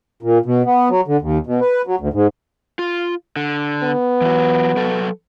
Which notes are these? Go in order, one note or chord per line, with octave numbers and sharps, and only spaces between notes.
A#2
B2
B3
F#3
D3
D#2
B2
B4
F#3
D2
G#2
F4
D3
B3
E3 F#3
F#3 A4 B4